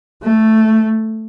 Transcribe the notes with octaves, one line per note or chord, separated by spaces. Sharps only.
A3